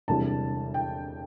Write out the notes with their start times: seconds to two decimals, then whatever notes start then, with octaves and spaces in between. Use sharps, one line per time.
0.08 E1 D2 C3 E3 G3 A5
0.74 G5